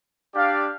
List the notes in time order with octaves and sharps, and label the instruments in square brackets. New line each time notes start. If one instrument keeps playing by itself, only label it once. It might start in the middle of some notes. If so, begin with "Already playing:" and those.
[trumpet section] D4 G4 D5 F5